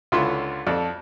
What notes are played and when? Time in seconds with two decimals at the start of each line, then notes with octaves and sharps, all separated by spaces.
0.12 C#2 D3 E4 F4 E5 C6
0.67 F2 A4 D5